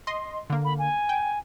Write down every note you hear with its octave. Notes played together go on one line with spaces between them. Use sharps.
D#5 C6
D3 A#3
B5
G#5
G5